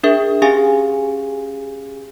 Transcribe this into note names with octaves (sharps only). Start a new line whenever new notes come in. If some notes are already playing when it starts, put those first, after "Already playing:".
D4 G#4 A#4 E5
C#4 G4 G#4 F5 G#5